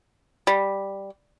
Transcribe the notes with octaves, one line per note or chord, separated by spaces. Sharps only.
G3